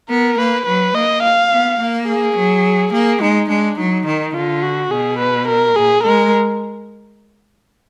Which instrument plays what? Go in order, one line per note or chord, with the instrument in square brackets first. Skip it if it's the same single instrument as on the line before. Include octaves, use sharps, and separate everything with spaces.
[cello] B3 [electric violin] A#4
[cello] A#3 [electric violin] B4
[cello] F#3 [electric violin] B4
[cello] A#3 [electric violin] D#5
[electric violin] F5
[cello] B3
A#3
[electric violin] G#4
[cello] F#3
[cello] A#3 [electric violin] G#4
[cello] G#3 [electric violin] D#4
[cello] G#3 [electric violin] D4
[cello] F#3 [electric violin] D#4
[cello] D#3
[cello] D3 [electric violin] F4
[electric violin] F#4
[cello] B2 [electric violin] G#4
[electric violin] B4
A#4
[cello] A#2 [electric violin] G#4
[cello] G#3 [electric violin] A#4